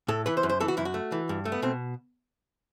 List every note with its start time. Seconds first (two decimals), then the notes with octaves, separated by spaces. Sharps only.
0.08 A2 A4
0.26 E3 B4
0.37 C5
0.43 F#2
0.49 C5
0.60 E3 A4
0.68 F#4
0.77 F#2 E4
0.85 F#4
0.94 A3
1.12 E3
1.29 G2
1.45 A3
1.52 B3
1.62 B2 C4